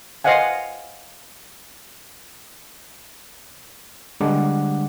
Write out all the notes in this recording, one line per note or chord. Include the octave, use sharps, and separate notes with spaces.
C5 D#5 F5 F#5 G#5
D3 G3 G#3 D4 F#5 D6